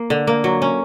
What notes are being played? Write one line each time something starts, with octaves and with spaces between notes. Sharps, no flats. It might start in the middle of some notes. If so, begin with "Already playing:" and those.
Already playing: A#3
D3
A#3
F#3
C#4